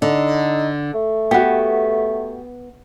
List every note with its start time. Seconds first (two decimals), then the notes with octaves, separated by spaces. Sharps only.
0.02 D3 D#4
0.94 A3
1.31 B3 F#4 G4